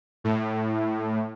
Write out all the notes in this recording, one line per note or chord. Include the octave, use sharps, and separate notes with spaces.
A2